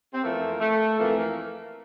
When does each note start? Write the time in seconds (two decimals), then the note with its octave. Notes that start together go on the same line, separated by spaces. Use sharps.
0.14 C4
0.22 F2 E3 A3 A#3
0.60 A3
0.98 F2 E3 A3 A#3
1.17 A#3